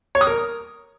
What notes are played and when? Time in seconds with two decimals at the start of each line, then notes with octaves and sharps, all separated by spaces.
0.15 C#5
0.21 D#6
0.27 A#4